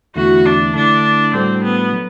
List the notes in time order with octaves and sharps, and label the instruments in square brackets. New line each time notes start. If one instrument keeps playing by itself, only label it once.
[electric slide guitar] E2 D3 A3 E4 [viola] F#4
[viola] D4
[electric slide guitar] D3 A3 E4 [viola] D4
[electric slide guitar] A2 G3 D4 F#4 A4 [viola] C4
[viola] B3
[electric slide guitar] F#3